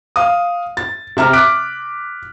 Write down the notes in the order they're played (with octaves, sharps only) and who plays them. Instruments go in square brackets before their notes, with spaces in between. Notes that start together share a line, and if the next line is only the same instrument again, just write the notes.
[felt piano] F5 D#6
A6
C3 E5 A#5 F6
D6 F#6 B6 D7